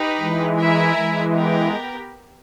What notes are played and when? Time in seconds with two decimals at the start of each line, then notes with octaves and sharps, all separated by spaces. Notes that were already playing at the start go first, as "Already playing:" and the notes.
Already playing: D#4 G4 B4
0.20 E3 G#3
0.58 E4 A#4 E5 G#5
0.96 E3 G#3
1.34 B3 G4 A#4